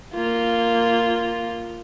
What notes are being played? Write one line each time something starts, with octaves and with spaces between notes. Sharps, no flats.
A#3 F4